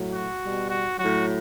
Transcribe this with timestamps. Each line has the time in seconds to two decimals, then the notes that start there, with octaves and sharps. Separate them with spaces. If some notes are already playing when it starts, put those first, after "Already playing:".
Already playing: A2 F#3
0.12 F#4
0.41 B2 G3
0.70 F#4
0.98 A2 F#3 F#4